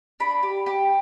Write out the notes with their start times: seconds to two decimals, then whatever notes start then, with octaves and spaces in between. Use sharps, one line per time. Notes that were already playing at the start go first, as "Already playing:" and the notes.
0.20 D4 B5
0.43 G4
0.66 G4